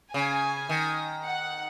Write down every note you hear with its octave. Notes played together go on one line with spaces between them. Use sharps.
C#3 G#5
D#3
F#5